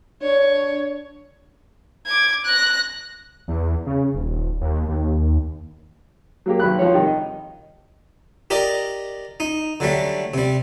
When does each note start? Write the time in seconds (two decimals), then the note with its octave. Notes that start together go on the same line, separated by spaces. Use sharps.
0.23 D4 C#5
2.07 D6 G#6
2.45 F#6 A#6
3.48 E2
3.86 C#3
4.14 D#1
4.61 D#2
4.88 D#2
6.46 F#3 A#3 G4
6.60 B1 D#3 B5 F#6
6.79 F3 C#5
6.94 C3 D#3 G3
7.06 D#5
8.50 G4 A#4 D5 D#5
9.40 D#4
9.80 D3 F#3 G3 A3
10.34 C3 G3